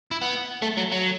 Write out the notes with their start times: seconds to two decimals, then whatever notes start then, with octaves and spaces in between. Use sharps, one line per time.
0.11 E4
0.21 B3
0.62 A3
0.77 F#3
0.92 F#3